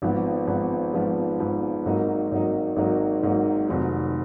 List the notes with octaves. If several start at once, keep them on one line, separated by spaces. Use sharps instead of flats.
G#1 G#2 F3 B3
G#1 G#2 F3 B3
G#1 G#2 F3 B3
G#1 G#2 F3 B3
G#1 G#2 F#3 A#3 D#4
G#1 G#2 F#3 A#3 D#4
G#1 G#2 F#3 A#3 D#4
G#1 G#2 F#3 A#3 D#4
F1 F2 D#3 F#3